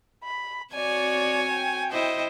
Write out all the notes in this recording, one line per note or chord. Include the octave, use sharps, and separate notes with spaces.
B5
C4 F#4 C#5 D5 G#5
G5
E4 C5 D#5